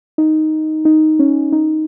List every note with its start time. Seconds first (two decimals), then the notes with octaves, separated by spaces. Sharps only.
0.18 D#4
0.85 D#4
1.19 C#4
1.53 D#4